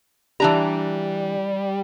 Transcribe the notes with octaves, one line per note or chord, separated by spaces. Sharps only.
E3 G3 D4 A#5